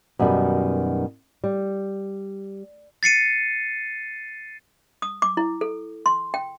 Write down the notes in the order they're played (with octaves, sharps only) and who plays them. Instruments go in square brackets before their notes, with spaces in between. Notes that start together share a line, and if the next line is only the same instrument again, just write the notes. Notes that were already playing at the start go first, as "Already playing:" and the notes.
[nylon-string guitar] F#2 B2 D#3 G3
G3
[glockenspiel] A6 C7 C#7 D#7
[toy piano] D#6
D6
E4
A4
C6
G5